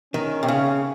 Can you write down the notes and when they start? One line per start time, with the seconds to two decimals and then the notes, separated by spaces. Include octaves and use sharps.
0.14 D#3 C#4
0.43 C3
0.48 C#3